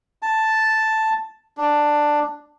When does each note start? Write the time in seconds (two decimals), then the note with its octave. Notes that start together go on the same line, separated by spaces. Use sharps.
0.22 A5
1.57 D4